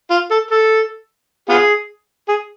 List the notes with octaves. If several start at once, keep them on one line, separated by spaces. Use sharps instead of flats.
F4
A4
A4
B3 F4 G#4
G#4